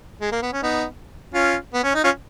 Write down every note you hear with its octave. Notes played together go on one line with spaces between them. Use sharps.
G#3
A#3
B3
C#4
B3 D#4
C#4 F4
B3
C#4
D#4
C#4 F4